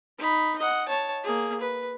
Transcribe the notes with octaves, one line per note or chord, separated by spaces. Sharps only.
D#4 B5
D#5 F#5
C#5 A5
A#3 G#4
B4